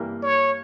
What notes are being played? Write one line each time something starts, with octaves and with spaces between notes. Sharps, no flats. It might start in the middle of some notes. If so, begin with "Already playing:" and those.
Already playing: G2 E3 G3 A#3
C#5